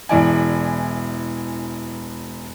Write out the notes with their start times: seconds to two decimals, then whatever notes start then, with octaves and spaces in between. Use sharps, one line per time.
0.09 E1 E3 D5 G#5